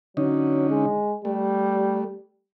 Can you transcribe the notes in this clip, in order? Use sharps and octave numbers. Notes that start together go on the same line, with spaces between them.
D3 F#3 C#4 D#4
G#3
G3 A3